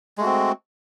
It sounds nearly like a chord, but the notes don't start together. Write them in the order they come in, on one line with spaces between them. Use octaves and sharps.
G#3 A3 F#4 C4